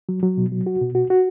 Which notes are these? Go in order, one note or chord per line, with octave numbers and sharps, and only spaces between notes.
F#3
F#3
B2
F#3
F#4
B2
F#4
F#4